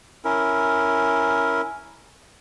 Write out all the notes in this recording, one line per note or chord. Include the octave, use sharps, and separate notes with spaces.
C#4 E4 A#4